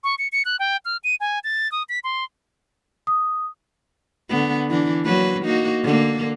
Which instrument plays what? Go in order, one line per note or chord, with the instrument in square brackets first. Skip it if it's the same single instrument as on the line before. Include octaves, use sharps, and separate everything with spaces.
[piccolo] C#6
C#7
C#7
F#6
G5
F6
D#7
G#5
A6
D#6
B6
C6
[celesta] D#6
[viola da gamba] D3 B3
E3 D4
F#3 A#3 B4
A#3 D#4 F#4
D3 A#3